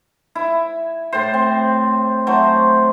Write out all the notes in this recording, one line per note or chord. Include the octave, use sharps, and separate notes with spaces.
E4
A2 C5
C4
F#3 A3 C5